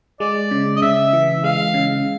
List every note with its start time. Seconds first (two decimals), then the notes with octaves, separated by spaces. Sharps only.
0.20 G#3 D5
0.51 C#3
0.76 D#5
0.82 C#3 E5
1.13 E3
1.44 G#3 F5
1.74 C#3